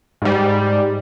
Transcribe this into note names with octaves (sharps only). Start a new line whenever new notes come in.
G#2 G3